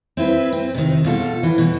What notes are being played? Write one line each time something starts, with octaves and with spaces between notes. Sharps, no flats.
C4 E4 B4
C4
C3 D#3
B2 F4 A4
E3
B2